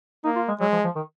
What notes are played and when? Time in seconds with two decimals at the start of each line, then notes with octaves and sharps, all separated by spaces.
0.24 A#3 D#4
0.36 F4
0.48 G#3
0.60 F#3 G#3
0.73 F3
0.84 F3
0.96 D#3